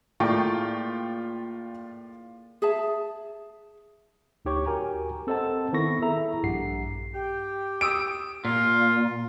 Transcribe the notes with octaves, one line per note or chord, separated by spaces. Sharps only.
A2 A#3 F4 G#4 D5 G5 C#6
G#4 E5 A5
D2 D#4 G4 C#5 C#6
F#4 G4 A#4 G5 G#5 A#5
C4 A4 C5 D#5 F#5 A5
D#3 B3 E4 A4 C#6 A#6
E4 G#4 A4 E5 A#5
A#1 G2 G4 F#5 C7
G4 G5
D#6 E6 D7
A#2 F4